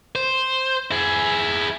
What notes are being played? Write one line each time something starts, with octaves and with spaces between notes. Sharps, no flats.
C5
E4 G#4